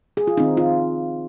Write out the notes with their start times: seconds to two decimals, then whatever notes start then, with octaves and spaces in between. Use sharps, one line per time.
0.17 G#4
0.27 F4
0.37 D#3 C4 D#4
0.57 F4